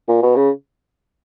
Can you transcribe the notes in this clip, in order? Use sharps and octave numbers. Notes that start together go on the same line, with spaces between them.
A#2
B2
C#3